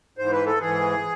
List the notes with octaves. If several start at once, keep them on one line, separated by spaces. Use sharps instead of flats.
G#2 E3 C5
B4
A4
G#2 E3 G#4